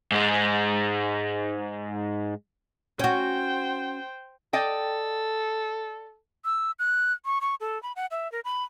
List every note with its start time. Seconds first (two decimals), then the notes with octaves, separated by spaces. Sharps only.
0.12 G#2 G#3
2.99 C#4 F#4 C5 G5
4.53 A4 D5 D#5 G5
6.45 E6
6.79 F#6
7.26 C#6
7.41 C#6
7.60 A4
7.83 B5
7.96 F#5
8.11 E5
8.32 A#4
8.45 B5